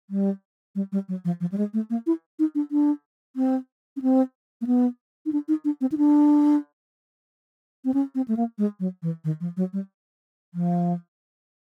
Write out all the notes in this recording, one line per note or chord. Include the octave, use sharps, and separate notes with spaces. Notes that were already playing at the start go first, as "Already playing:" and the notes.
G3
G3
G3
F#3
F3
F3
G3
G#3
A3
A#3
E4
D#4
D4
D4
C4
C#4
C4
A#3
B3
D#4
D4
D#4
D4
C4
D#4
D4
C4
C#4
C4
A3
A#3
G#3
F#3
E3
D#3
F3
F#3
G3
F3